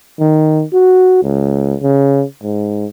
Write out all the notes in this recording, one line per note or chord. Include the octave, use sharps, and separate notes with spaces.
D#3
F#4
C#2
C#3
G#2